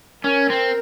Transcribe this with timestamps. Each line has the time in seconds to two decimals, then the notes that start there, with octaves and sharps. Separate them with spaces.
0.24 C#4 A#4
0.50 C4